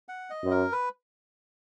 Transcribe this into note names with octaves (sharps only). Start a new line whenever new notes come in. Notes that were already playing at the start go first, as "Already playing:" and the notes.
F#5
D#5
F#2
A#4
B4